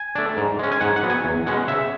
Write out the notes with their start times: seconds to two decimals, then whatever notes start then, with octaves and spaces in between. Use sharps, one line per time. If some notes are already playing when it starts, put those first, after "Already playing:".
Already playing: G#5
0.15 A3 D4
0.37 G#2
0.59 G#3 C#4
0.72 G#5
0.81 G#2 F#5
0.96 F#5
1.03 F#3 B3
1.10 G#5
1.25 E2
1.46 B2 G#3 C#4 F#5
1.68 C#3 E5